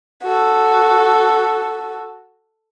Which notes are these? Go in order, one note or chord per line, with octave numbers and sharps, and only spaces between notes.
F#4 A4